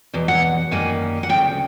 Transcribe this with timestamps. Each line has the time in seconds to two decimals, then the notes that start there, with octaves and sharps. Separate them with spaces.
0.14 E2 B2
0.28 F#5
0.71 F#2 D#3 G3 A#3 G#5
1.23 F#5
1.29 D2 C#3 F#3 A#3 G5